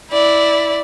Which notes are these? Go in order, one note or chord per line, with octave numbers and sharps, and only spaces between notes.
E4 D5